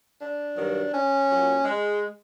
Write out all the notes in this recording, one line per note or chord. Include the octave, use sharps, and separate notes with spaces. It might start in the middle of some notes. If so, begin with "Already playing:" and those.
D4
G2 D#3 F#3
C#4
A#2 F#3
G#3